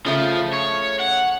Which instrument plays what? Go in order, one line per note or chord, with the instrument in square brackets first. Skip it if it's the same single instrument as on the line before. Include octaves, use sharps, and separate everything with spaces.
[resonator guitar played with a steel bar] C#3 A3 [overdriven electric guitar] F3
[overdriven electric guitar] C#5
F#5